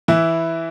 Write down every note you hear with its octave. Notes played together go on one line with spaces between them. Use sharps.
E3 E4